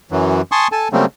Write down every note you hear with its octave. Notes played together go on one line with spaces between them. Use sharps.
F#2 E3 F#3
G#5 A5 C6 C#6 D#6
A4 G#5 A5
C#3 F#3 G3 A3 A#3 C4